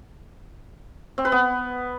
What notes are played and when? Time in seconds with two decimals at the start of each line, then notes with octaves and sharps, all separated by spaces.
1.18 C4
1.25 B4
1.32 B3